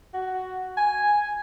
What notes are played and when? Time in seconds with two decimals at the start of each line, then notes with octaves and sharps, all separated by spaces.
0.14 F#4
0.77 G#5